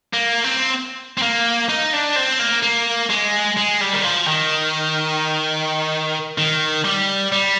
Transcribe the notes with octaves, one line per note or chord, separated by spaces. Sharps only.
A#3
C4
C4
A#3
D#4
D4
C4
A#3
A#3
G#3
G#3
G3
D#3
F3
D#3
D#3
G3
G3